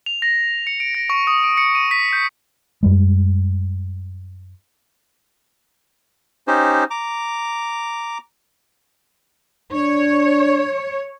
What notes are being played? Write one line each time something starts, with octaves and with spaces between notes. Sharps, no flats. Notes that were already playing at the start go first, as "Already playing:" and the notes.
F7
A#6
C#7
D7
A#6
C#6
D#6
D7
C#7
D#7
B6
G6
F#2 G3 G#3
C#4 D#4 G4 C5
A#5 D6
D4 C#5